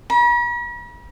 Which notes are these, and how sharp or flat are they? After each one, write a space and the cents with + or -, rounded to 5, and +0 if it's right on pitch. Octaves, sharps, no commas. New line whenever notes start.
B5 -45